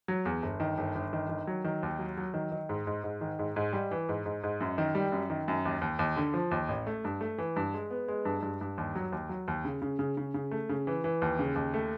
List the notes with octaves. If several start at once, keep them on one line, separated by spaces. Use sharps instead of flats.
F#3
E2
G1
D#3
G1
G1
D#3
D#3
F#3
D#3
D#2
F#3
F#3
D#3
D#3
G#2
G#2
G#2
D#3
G#2
G#2
G3
E3
G#2
G#2
G#2
F#2
D#3
G3
F#2
D#3
F#2
D#2
D#2
D#2
D3
F3
D#2
A1
A3
G2
A3
E3
G2
G#3
B3
G#3
G2
G2
G2
D#2
F#3
D#2
F#3
D#2
C#3
C#3
C#3
C#3
C#3
A3
C#3
E3
E3
D#2
C#3
D#2
A3